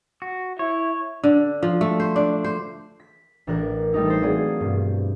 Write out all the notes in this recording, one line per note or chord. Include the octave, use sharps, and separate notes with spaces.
F#4
E4 C#5
D3
F3
A3
C5
D4
C5
B6
A1 D4 A#4 D6 F#6
G3 A3 D#4 E4
A4 B4 C5
F#3 A#3 C4 G#4 D5
G2 B2